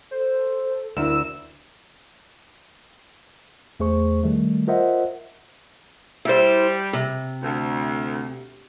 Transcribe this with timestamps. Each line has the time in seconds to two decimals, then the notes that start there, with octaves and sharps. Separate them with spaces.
0.11 A4 C5
0.97 D2 E4 A#4 E6
3.80 E2 A3 G#4 C5 C#6
4.23 D#3 G3 A3
4.67 F4 A#4 C5 D#5 E5 F#5
6.25 G3 E4 C5
6.93 C3
7.42 D2